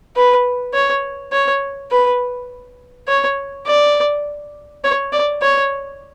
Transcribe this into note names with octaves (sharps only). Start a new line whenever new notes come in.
B4
C#5
C#5
B4
C#5
D5
C#5
D5
C#5